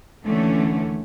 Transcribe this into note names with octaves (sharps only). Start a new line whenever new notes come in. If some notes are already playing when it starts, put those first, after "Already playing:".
D#2 D3 E3 A3 C#4